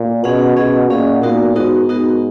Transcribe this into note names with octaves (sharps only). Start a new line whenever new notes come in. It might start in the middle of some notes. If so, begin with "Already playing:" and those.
Already playing: A#2
B2 C#4 G#4 D#5 F#5
B2 C#4 G#4 D#5 F#5
A#2 C#4 G#4 D#5 F#5
A#2 B3 D#4 F#4 A#4
G#2 B3 D#4 F#4 A#4
G#2 B3 D#4 F#4 A#4